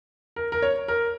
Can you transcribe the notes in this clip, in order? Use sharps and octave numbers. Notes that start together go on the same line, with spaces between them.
A#4
A#4
C#5
A#4